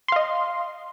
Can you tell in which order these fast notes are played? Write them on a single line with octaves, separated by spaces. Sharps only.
C6 F5 D#5